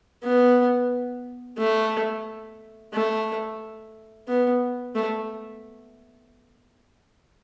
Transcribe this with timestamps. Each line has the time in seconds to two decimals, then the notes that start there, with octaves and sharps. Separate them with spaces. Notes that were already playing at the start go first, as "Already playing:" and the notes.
0.23 B3
1.58 A3
2.93 A3
4.28 B3
4.95 A3